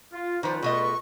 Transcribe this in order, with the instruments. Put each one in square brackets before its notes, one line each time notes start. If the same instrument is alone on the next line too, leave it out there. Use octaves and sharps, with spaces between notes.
[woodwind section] F4
[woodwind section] C#2 F4 B4 [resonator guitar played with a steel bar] D#3 F3 [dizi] C5
[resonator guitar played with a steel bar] B2 A3 D#5 [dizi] C#6